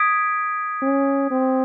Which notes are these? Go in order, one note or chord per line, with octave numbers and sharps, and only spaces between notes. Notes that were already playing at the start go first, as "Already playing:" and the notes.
Already playing: D#6 G#6 B6 D7
C#4
C4